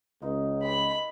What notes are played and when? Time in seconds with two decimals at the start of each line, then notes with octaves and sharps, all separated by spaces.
0.22 C#2 D#4 F4 D#5
0.63 G3 G#3 B4 B5